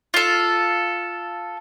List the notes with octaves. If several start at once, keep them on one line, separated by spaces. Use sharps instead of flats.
F4 A4